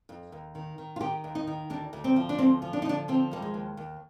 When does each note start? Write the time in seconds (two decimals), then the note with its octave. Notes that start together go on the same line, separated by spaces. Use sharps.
0.09 F2
0.32 D#2
0.55 D#3
0.78 D#3
0.96 F4
1.01 D#3 G4
1.24 D#2
1.35 D#4
1.47 D#3
1.70 D2 D4
1.93 D2
2.04 C4
2.16 F3
2.29 D4
2.39 D2 C4
2.62 F3
2.73 D4
2.82 D#4
2.85 D3 D4
3.08 F3 C4
3.31 D#2 G3
3.42 G#3
3.54 D#2
3.77 D#2